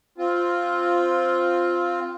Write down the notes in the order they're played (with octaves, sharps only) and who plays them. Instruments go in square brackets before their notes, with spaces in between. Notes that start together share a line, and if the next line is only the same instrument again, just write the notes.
[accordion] C4 F4